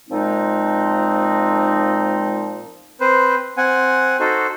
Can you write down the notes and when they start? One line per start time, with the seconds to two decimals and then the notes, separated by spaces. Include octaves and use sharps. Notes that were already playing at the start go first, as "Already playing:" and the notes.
0.09 A#2 F3 G#3 C4 D#4
3.01 C4 B4 C5
3.57 C4 F#5 G#5
4.20 D#4 F#4 A4 C5